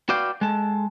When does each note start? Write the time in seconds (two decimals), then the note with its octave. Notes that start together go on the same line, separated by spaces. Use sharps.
0.09 F#4 B4 D5 F5 G5
0.41 G#3 A4